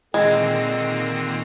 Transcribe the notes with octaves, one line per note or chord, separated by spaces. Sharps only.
A#2 D3 D#3 G#3 C4 A#6